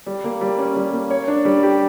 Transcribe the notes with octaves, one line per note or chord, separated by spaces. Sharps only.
G3
A#3
G3
C#4
G3
A#3
C#5
D4
G3
G4